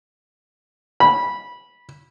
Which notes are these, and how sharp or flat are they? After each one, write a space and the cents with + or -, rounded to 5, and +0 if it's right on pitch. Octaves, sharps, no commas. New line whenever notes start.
B5 -15